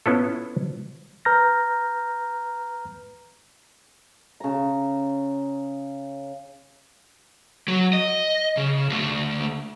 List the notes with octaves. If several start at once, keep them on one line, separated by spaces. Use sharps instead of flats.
B3 C#4 E4 F4 A4
B4 A#5 F6 G6 A#6
C#3 A#5
F#3
D#5
C#3
D2 A3